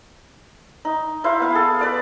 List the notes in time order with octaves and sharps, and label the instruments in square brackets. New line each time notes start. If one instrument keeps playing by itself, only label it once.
[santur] D#4
E4 C5 F5
B3 F5
G#4 A4
B4 D5 F5